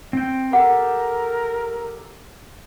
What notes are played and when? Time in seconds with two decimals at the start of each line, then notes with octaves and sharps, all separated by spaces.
0.13 C4 G5
0.53 G4 A4 A#4 F#5